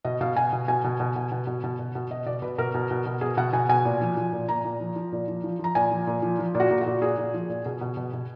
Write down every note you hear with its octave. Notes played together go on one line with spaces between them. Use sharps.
B2 D#5
B2 F5
B2 G#5
B2
B2 G#5
B2
B2
B2
B2
B2
B2
B2
B2
B2 D#5
B2 D5
B2 B4
B2 A#4
B2
B2
B2
B2 G#4
B2 F#5
B2 G#5
B2 G#5
A#2
F3
F3
A#2
A#2 A#5
A#2
F3
F3
A#2
F3
F3
F3 A#5
A#2 G#5
F3
A#2
F3
F3
A#2
F#4
A#2
A#2 F#4
A#2 G#4
A#2
F3
A#2
B2 G#4
B2
B2
B2